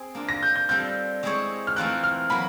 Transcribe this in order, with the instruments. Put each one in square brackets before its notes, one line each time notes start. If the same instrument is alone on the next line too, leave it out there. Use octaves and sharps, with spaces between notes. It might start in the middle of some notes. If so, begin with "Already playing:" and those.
Already playing: [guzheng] C4 G#4
A#3 D4 F4
[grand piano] A#6
G6
G6
[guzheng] G3 C4 F4 A4 [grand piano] G6
[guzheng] G#3 C4 E4 G#4 C#5
[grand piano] F6
[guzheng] E3 A3 C4 F4 A#4 [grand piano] F#6
[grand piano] F6
[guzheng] F#3 A#3 [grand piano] B5